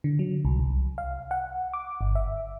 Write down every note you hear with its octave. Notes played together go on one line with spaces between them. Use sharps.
D3
F#3
C2
C2
F5
F#5
D6
G1
E5